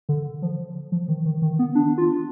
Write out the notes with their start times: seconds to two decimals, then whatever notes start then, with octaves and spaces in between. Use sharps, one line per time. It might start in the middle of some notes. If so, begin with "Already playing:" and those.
0.09 D3
0.42 F3
0.92 F3
1.08 D#3
1.26 D#3
1.42 D#3
1.59 B3
1.75 D4
1.98 F4